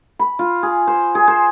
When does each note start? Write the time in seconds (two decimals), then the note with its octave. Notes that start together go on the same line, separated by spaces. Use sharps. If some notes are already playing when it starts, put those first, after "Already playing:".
0.19 B5
0.39 F4
0.63 G#4
0.87 C5
1.15 G#4
1.28 C5